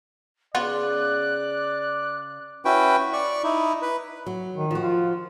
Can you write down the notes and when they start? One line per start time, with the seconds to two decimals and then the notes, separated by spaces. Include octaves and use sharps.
0.55 C#3 B3 F4 F#4 D5 F#6
2.65 C#4 E4 F#4 B4 G5
3.13 D5 C#6
3.44 D#4 E4
3.82 B4
4.26 F#3
4.55 D#3
4.71 F3 F#4
4.82 F4